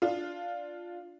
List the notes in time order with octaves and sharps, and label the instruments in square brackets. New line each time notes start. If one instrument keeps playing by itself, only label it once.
[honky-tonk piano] D4 F4